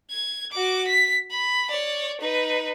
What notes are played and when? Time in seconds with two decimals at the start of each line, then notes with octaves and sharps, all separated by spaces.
0.10 G#6
0.51 F#4 D6
0.86 B6
1.31 B5
1.70 C#5 D5
2.21 D#4 B4